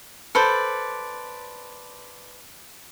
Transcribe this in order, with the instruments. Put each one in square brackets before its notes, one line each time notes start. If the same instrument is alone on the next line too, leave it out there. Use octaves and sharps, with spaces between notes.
[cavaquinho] A4 B4 C5 D5